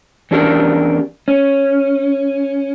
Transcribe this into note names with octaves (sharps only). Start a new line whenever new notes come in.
E2 C#4 D4 G4 A#4
C#4